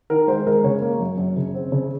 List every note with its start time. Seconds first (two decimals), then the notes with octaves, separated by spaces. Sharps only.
0.10 D#3 A#4
0.27 G#3 C5
0.47 G#3 A#4
0.64 C#3 C#5
0.82 A#3
1.00 F#2
1.18 F#2
1.37 C#3
1.54 C4
1.72 C#3